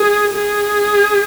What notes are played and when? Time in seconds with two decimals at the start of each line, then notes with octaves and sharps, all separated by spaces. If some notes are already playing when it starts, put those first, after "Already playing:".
Already playing: G#4
0.34 G#4